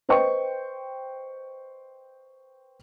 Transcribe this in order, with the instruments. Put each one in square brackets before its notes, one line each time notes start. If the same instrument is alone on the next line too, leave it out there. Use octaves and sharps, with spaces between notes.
[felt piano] B4 C5 D#5 G5 C#6